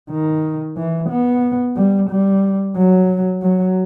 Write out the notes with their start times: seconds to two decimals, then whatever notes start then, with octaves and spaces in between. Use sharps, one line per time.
0.10 D#3
0.77 E3
1.10 B3
1.76 G3
2.10 G3
2.77 F#3
3.42 F#3